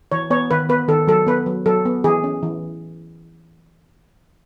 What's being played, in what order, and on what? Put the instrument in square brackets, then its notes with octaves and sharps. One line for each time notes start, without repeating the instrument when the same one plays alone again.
[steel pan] E3 C#5
B3 C#5
D#3 B4
B3 B4
D#3 A4
F#3 A4
B3 B4
F#3
F#3 A4
B3
E3 G#4
C#4
E3